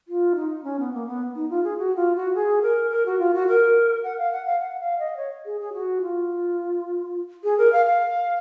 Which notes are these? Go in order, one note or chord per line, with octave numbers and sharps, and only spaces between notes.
F4
D#4
C#4
B3
A#3
B3
D#4
F4
G#4
F#4
F4
F#4
G#4
A#4
A#4
F#4
F4
F#4
A#4
F#5
F5
F#5
F5
F#5
F5
D#5
C#5
G#4
G#4
F#4
F4
G#4
A#4
F5
F5